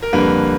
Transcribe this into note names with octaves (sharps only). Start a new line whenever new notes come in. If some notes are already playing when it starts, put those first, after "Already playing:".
A#4
F2 D3 G3 A#3 B4